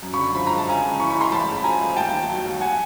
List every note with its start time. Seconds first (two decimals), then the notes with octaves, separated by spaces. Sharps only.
0.02 F#2
0.14 B5 C#6
0.18 D3
0.35 F3 B5
0.47 G#3 A#5
0.58 A5
0.67 C#2 G#5 A#5
0.83 C#3
1.00 E3 B5 C#6
1.10 B5 C#6
1.16 G#3
1.21 A#5 C6
1.32 A1 A5 B5
1.48 G#2
1.57 B5
1.64 F3 G#5 A#5
1.80 A3
1.97 D#2 G5 A5
2.13 D#3
2.29 F#3
2.45 D#2
2.61 F#5 G#5